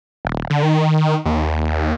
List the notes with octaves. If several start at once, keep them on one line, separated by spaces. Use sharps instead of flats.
D#1
D3
D#3
D#2